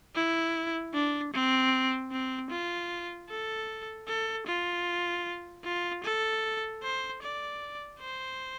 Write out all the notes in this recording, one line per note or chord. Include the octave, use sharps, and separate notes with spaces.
E4
D4
C4
C4
F4
A4
A4
F4
F4
A4
C5
D5
C5